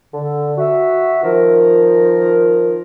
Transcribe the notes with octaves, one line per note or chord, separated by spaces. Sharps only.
D3
F#4 E5
D#3 F3 A#4